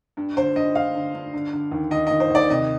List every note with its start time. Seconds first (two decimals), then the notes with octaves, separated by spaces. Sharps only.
0.17 G2
0.36 D3 C5
0.56 G2 D#5
0.75 G2 F5
0.95 D3
1.15 G2
1.34 D3
1.53 D3
1.72 D#2
1.91 D#2 D#5
2.07 D#2 D#5
2.20 C5
2.30 D#2 D5
2.50 C2 D#5